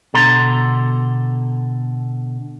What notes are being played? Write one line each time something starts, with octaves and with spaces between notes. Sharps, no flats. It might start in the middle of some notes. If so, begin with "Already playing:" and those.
B2 D3 A4 A#5 C6